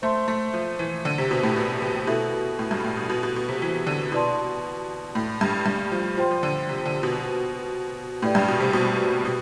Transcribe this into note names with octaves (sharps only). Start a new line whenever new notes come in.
A3 C5 E5 A5 C6
A3
F3
E3
D3
C3
B2
A2
B2
C3
B2 E4 A4 E5
A2
G2
A2
B2
B2
B2
B2
C3
E3
D3
B2 E4 B4 D5 A5 C6
A2
G2
G2
F3
F3 C5 G5 C6
F3
D3
C3
D3
B2
A2 G4 B4 D5 G5
G2
B2
C3
B2
B2